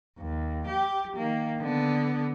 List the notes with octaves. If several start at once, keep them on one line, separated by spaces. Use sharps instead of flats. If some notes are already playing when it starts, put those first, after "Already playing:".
D#2
G4
D#3 A#3
D3 B3